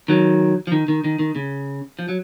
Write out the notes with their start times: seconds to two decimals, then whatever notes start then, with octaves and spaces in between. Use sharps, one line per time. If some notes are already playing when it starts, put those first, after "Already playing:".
0.08 D#3 F#3
0.67 F3
0.72 D#3
0.88 D#3
1.04 D#3
1.19 D#3
1.35 C#3
1.99 F3
2.09 F#3